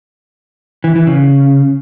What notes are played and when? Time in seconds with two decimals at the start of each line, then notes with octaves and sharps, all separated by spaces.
0.84 E3
0.95 E3
1.07 C#3